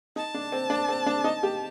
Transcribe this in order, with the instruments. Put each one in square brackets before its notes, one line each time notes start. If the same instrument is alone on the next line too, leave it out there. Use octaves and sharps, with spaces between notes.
[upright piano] D#4 [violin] A5
[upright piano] D4
C4
D4
C4
D4
D#4
G4